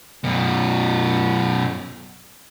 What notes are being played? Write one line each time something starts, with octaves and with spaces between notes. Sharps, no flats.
F#2 B2